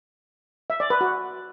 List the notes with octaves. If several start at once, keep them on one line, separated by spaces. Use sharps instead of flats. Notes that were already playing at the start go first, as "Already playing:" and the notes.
E5
D5
B4
F#4